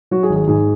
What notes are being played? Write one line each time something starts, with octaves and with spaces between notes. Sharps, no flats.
F#3 F#4
G#4
G#1
G#4
G#2 G#4